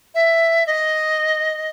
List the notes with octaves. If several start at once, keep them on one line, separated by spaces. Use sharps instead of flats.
E5
D#5